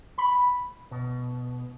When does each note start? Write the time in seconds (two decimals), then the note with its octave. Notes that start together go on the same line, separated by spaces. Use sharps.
0.18 B5
0.91 B2